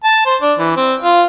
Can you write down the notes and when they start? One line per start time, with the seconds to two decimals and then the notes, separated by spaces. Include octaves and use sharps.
0.04 A5
0.26 C5
0.42 D4
0.59 E3
0.77 C4
1.02 F4